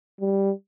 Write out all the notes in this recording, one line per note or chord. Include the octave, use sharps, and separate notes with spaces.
G3